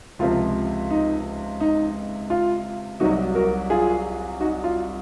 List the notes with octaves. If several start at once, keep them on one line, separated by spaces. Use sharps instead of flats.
C#2 C3 F3 F4
D#4
D#4
F4
C2 C3 F#3 D#4 F#4
F#4 A#4
F4 G#4
D#4 F#4
F4